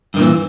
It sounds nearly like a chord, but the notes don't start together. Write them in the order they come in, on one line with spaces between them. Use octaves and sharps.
G2 D#3 A#2 E3